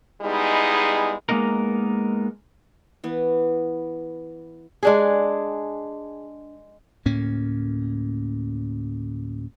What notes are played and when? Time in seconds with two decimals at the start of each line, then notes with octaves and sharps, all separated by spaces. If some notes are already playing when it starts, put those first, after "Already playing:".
0.22 G3 G#3 B3 D#4 E4 G#4
1.29 G#3 A#3 B3 D#4 A#4
3.04 E3 B3
4.83 G#3 D4 G#4
7.06 D2 A2 A#3 C#4